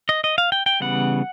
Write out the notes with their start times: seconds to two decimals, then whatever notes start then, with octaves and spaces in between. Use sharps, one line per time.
0.09 D#5
0.24 D#5
0.38 F5
0.52 G5
0.66 G5
0.80 C#3 E3 G3 B3 F#5